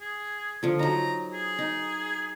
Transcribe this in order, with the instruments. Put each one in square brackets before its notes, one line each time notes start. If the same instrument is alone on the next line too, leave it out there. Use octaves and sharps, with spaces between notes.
[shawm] G#4
[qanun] D3 F3
[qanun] F#3 D#4 [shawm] A#5
[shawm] G#4
[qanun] D#4